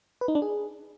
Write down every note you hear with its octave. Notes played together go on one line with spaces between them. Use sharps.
B4
D#4
D4
G#4